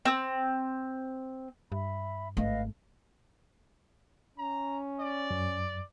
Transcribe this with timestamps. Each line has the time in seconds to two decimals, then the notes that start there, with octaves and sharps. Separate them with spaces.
0.05 C4 E6
1.72 G2 E5 B5
2.37 G#1 A3 B4 D#5 F5
4.38 C#4 A#5
5.00 D5
5.31 F#2